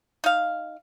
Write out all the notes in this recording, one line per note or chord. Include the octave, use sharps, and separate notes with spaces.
D#4 F5